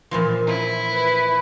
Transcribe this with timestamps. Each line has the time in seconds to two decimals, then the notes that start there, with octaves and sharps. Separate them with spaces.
0.11 A#2 E3 F3
0.47 E4
0.91 B4